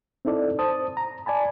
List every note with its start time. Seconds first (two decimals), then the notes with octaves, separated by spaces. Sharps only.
0.25 C4 D#4 E4 A4 D5
0.59 C5 A5 D#6
0.97 A#5
1.26 D5 G#5 A5 B5